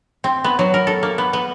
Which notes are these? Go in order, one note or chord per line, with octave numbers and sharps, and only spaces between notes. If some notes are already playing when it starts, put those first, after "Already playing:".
C4
B3
F#3
A#4
A4
A#3
B3
B3